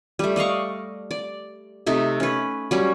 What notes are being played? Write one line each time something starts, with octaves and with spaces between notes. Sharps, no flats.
G3 A3
D5 D#5 F5 C#6
D5
C3 A3 D#4
C#4 B4
F#3 G3 C#4